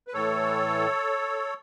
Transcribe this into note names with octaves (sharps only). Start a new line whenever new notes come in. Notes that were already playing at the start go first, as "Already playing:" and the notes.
B4
A2 E3 A4 C#5